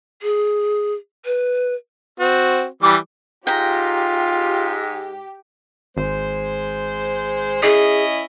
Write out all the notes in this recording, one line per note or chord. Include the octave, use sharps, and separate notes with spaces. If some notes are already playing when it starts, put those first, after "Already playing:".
G#4
B4
C4 F#4
E3 G3 D6
G#2 F4 G4 G5 A#5
G#1 G#3 C5
C#4 E4 G#4 D#5